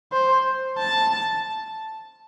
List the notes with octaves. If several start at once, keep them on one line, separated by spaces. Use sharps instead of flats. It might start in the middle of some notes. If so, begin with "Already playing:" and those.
C5
A5